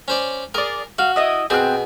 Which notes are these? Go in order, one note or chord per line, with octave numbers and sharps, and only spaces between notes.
C#4 C5 D5
G#4 A#4 D5
F#4 F5
E4 D#5 D#6
B2 C4 G#4 D#6 F#6